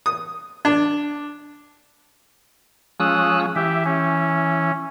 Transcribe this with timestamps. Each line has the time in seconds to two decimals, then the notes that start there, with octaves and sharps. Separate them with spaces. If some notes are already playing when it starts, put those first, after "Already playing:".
0.06 D#6
0.65 D4
3.00 F3 G#3 C#4 D#6 E6 F#6
3.56 E3 G4 E5
3.85 C#4